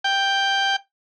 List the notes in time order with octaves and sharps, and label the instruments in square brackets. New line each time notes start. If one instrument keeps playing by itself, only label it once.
[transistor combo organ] G5